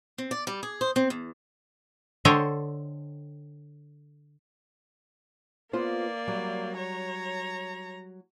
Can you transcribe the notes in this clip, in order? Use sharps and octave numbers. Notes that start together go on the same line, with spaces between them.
C4
D5
G3
G#4
C5
C4
E2
D3 A4 C5 C#5 D#5 G5
A#3 B3 F4 C5 D5
F#3 G3
C#5 A#5